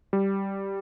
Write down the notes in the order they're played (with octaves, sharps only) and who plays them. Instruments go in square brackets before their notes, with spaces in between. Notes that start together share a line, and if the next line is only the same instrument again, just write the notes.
[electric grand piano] G3